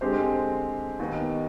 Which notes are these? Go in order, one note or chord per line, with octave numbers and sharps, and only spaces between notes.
D3 G#3 C4 G4 C5
D#2 D#3 B3